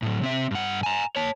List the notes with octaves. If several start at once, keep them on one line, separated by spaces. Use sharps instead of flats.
A2 F#3
C3 C4 E5
G2 F#5
G#5 A#5
C#5 A5